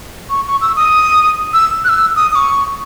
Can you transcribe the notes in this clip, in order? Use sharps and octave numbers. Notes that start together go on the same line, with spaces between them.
C#6
C#6
E6
D#6
E6
F#6
E6
D#6
D#6
C#6